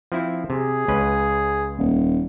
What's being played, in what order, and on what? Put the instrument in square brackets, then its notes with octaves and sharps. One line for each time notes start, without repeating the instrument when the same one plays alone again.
[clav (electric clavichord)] F3 C4 E4
[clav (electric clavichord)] C3 [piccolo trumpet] G#4
[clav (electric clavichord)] C#2 C#4 B4
[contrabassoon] D#1